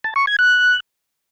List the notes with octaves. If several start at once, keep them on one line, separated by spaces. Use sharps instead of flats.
A5
C#6
G#6
F#6